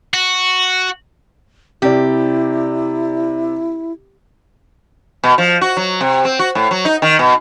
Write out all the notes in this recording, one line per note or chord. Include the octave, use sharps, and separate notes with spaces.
F#4
C3 E4 G4 D5
B2
F3
F#4
F#3
C3
C4
F#4
A2
F#3
D#4
D#3
B2